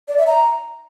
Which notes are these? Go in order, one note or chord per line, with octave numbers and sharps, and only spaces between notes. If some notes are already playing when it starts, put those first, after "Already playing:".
D5
E5
A#5